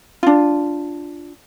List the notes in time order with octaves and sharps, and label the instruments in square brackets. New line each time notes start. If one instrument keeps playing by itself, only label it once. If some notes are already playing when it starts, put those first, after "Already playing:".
[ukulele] D4 F4